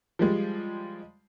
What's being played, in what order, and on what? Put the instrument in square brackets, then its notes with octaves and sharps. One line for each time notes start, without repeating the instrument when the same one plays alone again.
[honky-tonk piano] F3 G3 G#3